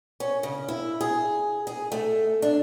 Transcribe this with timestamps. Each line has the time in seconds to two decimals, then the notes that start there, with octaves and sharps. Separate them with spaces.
0.20 C#4
0.43 C#3
0.68 E4
1.01 G#4
1.67 G#4
1.92 A3
2.42 D4